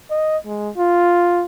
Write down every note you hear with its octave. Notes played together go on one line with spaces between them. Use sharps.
D#5
G#3
F4